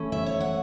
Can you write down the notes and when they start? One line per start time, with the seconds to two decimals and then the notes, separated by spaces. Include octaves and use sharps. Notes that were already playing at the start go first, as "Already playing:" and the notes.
Already playing: E3 A3 C#4
0.12 E5
0.26 C#5
0.40 F#5